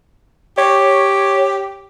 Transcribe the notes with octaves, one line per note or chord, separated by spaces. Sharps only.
G4 C#5